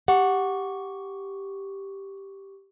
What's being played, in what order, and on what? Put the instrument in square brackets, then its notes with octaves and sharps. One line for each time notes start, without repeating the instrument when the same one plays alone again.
[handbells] G4 C#6 [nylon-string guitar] F#5